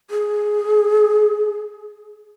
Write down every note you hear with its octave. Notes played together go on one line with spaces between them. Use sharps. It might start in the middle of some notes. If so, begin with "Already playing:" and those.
G#4